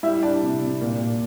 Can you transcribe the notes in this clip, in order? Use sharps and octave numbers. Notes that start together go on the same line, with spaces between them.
G3 E4 E5
G3 D4 D5
C3
C3
A#2
A#2